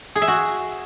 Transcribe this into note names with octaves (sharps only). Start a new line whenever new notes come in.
G#4
E5
F#4